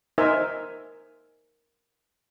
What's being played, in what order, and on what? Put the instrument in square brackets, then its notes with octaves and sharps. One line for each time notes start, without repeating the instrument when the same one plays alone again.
[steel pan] D#4 A#4 C5 E5 G#5